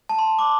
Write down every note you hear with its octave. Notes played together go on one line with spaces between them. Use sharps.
A5
C6
D6